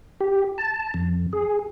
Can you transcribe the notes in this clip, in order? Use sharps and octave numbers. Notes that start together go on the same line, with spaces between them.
G4
A5
F2
G#4